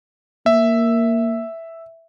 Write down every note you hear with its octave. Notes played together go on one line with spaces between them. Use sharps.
A#3 E5